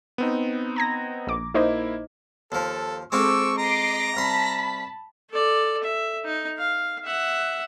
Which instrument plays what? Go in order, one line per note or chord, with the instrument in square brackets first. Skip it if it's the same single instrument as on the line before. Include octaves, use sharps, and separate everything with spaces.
[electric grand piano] B3 C4 D#4
[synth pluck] A#5 G#6 A#6
A#1 D6
[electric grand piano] A#3 E4 [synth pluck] D#4 C5 D#5
[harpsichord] D#2 F3 [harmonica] A4
[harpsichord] G#3 C4 F4 [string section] A4 C5 [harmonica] C#6 D6 E6
[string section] D#5 D6 C7 [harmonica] A#5
[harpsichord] C2 C6 [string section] A5 B5 B6
[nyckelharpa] A4 D5
E5
D#4
F5
E5 F#5